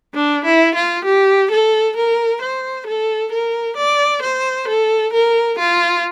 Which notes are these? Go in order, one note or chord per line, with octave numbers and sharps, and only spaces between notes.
D4
E4
F4
G4
A4
A#4
C5
A4
A#4
D5
C5
A4
A#4
F4